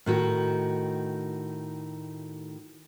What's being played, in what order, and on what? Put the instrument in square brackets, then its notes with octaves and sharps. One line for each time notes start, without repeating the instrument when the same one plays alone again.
[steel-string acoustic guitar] A2 D#3 F#4